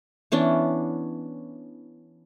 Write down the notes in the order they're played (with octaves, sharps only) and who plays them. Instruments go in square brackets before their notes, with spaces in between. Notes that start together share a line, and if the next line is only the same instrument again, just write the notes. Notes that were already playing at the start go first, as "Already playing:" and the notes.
[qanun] E3 B3 C#4 D4